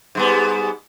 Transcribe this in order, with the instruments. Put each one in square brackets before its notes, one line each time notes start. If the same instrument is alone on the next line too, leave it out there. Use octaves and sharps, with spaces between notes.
[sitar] G#2 G3 B3